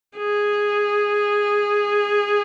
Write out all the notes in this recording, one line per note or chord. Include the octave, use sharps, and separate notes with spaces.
G#4